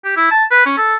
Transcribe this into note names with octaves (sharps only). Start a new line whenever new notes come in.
G4
E4
A5
B4
C#4
A4